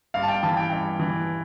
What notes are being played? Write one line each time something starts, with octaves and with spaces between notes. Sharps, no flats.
G2 F5
A5
G5
E3 A5
G5
G2
E3